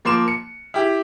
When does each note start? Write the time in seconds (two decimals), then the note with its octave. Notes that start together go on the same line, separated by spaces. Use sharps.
0.05 F3 A#3 C6 D6 E7
0.28 C#7
0.74 E4 G4